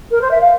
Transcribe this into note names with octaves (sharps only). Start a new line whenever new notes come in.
A#4
C5
E5
F5